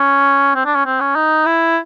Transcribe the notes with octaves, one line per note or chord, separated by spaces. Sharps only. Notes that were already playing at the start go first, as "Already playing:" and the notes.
Already playing: C#4
C4
D4
C#4
C4
C#4
D#4
E4